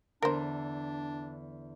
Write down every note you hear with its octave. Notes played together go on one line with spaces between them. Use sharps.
E2 D3 D4 A#4 C5